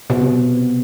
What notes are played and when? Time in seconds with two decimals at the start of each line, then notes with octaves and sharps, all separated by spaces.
0.10 B2
0.21 C3